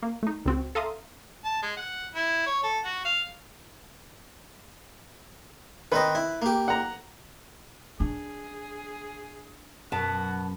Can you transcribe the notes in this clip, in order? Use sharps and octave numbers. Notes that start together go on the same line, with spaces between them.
A#3
A3 D#4
C#2 C4 F#4
A4 E5 F5 A#5 C6 D#6
A5
G#3
F#5
E4
C#5
A4
F#4
F5
D#3 C4 B4 D#5
E4
A#3 G4
F#5 A#5
D4 G#4
F#2 B2 B3 F#4 A5